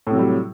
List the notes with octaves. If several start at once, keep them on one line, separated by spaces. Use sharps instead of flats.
A2 C3 F#3 G3